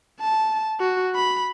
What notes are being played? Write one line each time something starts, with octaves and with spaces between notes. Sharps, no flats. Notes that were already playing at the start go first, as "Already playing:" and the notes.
A5
F#4
B5